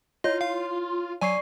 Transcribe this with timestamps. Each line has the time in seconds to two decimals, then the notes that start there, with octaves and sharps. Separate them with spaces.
0.24 E4 F4 C#5 D#5
0.41 F5
1.21 F#3 D5 G#5 C#6 C7